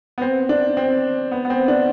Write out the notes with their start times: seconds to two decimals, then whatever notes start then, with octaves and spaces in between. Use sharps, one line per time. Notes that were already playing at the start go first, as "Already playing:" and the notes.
0.18 B3
0.21 C4
0.49 D4
0.77 C4
1.32 B3
1.45 B3
1.50 C4
1.68 D4